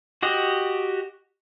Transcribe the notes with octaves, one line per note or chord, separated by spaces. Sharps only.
F#4 G4 D#5